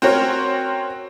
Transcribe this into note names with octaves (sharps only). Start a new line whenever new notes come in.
C4 C#4 F#4 A#4 C5 C#5